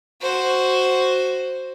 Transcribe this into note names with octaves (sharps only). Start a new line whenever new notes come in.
F#4 C5